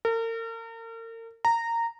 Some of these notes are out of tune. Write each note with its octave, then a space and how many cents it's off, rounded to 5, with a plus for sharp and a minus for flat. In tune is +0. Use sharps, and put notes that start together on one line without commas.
A#4 -40
A#5 -15